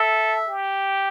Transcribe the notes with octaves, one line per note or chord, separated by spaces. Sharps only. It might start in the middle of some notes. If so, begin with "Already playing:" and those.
Already playing: A4 E5
G4